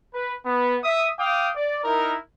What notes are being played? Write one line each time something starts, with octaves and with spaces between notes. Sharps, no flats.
B4
B3
E5 D#6
F5 G5 D6 D#6
D5
D#4 E4 A#4